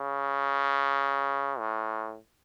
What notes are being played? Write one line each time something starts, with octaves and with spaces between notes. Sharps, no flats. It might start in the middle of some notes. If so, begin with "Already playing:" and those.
Already playing: C#3
A2